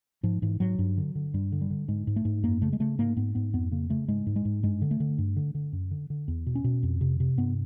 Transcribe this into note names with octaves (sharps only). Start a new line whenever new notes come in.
G#2 F3
G#2 E3
G#2 F#3
G2
D3
D3
G2 G3
D3
G3
D3
G#2 G#3
G#2
A3
G#2
F#2 A#3
C#3 A3
G#3
C#3 A3
G#2 A#3
G#2 B3
G#2 B3
F2 B3
C#3 A#3
C#3 A3
G#2 G#3
G#2
G#3
G#2
G2 G#3
D3
A3
D3
G2
D3
D3
F#2
D3
D3
E2
B2
C#4
B2
F2
C3
C3
G2 B3